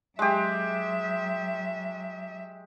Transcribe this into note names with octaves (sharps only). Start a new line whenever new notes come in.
F#3 G#3 G4 E5